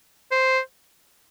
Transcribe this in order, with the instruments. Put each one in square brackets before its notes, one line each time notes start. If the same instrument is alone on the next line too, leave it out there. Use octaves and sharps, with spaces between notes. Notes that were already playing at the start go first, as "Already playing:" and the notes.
[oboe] C5